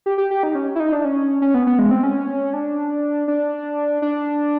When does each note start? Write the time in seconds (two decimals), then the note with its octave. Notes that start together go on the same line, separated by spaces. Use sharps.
0.06 G4
0.18 G4
0.31 G4
0.43 D#4
0.55 C#4
0.75 E4
0.80 D#4
0.93 D4
1.05 C#4
1.42 C#4
1.54 B3
1.67 B3
1.79 G#3
1.91 C4
2.03 C#4
2.53 D4
3.28 D4
4.02 D4